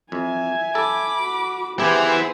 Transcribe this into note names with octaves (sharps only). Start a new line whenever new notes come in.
F2 E5 G#5
A4 B5 D6
F#4
B3 E4 G4 G#4 B4 C5 G#5